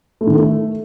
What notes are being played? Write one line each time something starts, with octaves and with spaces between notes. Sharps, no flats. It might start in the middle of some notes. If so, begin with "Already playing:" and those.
A3
D#3
A3